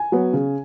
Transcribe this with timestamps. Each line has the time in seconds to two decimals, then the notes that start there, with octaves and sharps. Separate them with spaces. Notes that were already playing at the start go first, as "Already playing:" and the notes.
Already playing: G#5
0.12 F#3 B3
0.33 C#3